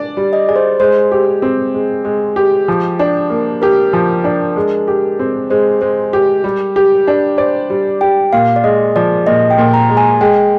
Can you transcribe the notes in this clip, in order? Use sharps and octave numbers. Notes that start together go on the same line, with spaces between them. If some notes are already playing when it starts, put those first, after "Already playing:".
Already playing: D4 D5
G3
D#5
G#4 D5
C5
G#3 C5
G4
C4
G#3
G#3
G4
F3
D4
A#3
G4 A#4
F3
D4
G#3
G4
C4
G#3 C5
G#3 C5
G4 A#4
G3
G4
D4
C5 D5
G3
G4 G5
A#2 F5
D5
G#3 D#5
F3 D5
A#2 D#5
G5
A#2
A#5
G#3
G#5
G#3 G5